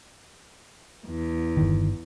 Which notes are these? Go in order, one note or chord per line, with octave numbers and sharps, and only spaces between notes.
E2
G1 D#3